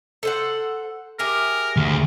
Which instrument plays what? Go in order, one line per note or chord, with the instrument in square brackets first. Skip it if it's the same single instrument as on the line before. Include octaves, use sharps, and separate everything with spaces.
[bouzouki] A4 C5 F#5
[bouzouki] G4 G#4 E5 [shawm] A#4
[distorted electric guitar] D2